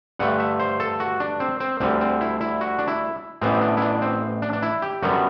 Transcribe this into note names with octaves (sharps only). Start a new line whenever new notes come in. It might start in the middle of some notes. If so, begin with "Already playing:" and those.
G2 D3 A3 F#5
E5
C5
A4
F#4
D4
C4
C4
D2 D3 G3 C4
C4
E4
E4
F#4
D4
E4
A1 A2 E3 B3 C4
C4
D4
E4
D4
C4
D4
D4
E4
G4
F#2 D3 G3 B3 F#4